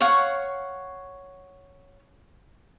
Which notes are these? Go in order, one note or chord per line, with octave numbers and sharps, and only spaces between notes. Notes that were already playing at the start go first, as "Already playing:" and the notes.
C#5 F5 F#5 C#6